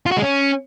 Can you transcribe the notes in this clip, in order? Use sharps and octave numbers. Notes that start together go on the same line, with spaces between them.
F4
F#4
G#3
C#4